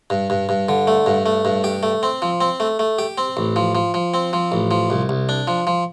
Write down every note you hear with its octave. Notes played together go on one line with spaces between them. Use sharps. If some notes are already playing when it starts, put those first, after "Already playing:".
G2
G2
G2
D3
A3
G2
A3
G2
G4
A3
C4
F3
C4
A3
A3
G4
C4
A1
F3
F3
F3
C4
F3
A1
F3
C2
C2
D4
F3
F3